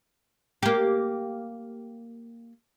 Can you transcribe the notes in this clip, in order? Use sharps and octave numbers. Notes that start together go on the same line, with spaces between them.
A#3 G4